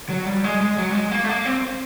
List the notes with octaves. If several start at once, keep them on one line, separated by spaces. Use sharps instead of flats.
F#3
G3
G#3
G#3
F#3
G3
G#3
A#3
A3
A#3
C4